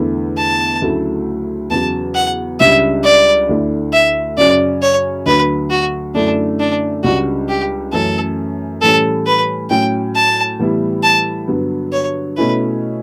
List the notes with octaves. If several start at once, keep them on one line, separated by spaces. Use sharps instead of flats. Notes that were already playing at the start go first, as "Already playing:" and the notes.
Already playing: E2 D3 A3 E4
A5
D2 C#3 F#3 A3 E4
E2 C#3 F#3 A5
F#5
C#2 C#3 G3 D4 E5
D5
D2 D3 A3 E4
E5
F#2 C#3 F#3 C#4 D5
C#5
D2 D3 F#3 B4
F#4
F#2 D3 A3 D4 E4
D4
C#2 C#3 G3 D4 F#4
G4
F#2 E3 A3 C#4 A4
A2 E3 G3 C#4 A4
B4
A2 F#3 C#4 G5
A5
A2 E3 G3 B3 E4
A5
G2 D3 F#3 B3
C#5
B2 A3 C#4 E4 B4